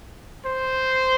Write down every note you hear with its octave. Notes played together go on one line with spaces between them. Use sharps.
C5